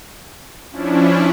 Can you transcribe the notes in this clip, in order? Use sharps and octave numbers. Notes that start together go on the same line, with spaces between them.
F3 C#4 D4 E4